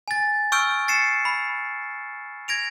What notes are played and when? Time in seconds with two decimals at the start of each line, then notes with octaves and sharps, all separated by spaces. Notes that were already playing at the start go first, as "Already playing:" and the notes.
0.08 G#5 A6
0.52 C#6 E6 F6 G6 D7
0.88 A6 C7 C#7 E7
1.25 B5
2.48 G#6 A#6 D7 F7